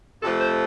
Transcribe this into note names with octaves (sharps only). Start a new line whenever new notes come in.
F2 C3 F3 A3 A4
C5